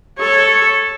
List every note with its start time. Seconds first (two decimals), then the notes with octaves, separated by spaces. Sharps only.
0.18 A4 C#5